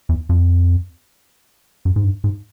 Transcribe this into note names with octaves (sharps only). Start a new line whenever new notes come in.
E2
F2
F#2
G#2
G2
G#2